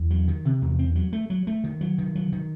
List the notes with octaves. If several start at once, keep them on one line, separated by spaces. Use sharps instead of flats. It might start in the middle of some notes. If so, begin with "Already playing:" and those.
Already playing: E2
F#3
D#3
C3
E2
C4
F#3
A3
F#3
A3
D#3
F#3
D#3
F#3
D#3